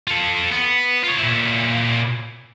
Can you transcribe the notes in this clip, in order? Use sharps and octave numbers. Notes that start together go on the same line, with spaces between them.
F4 A4
B3
F4 C#5
A#2 E4